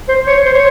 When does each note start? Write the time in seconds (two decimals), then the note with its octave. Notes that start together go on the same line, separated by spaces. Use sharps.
0.08 C5
0.27 C#5
0.45 C5
0.54 C#5